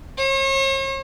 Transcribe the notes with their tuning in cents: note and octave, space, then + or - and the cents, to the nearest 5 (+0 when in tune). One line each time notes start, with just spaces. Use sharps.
C#5 -45